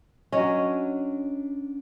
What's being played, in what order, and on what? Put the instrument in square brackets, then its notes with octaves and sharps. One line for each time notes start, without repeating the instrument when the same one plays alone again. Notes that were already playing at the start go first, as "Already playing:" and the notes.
[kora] F#3 C#4 [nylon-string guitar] D4 C#5 D#5